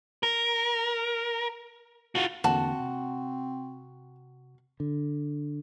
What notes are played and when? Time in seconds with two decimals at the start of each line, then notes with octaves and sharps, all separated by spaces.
0.23 A#4
2.15 F4 F#4
2.44 E2 D3 A#3 C4 F#4 A5
2.80 C3
4.80 D3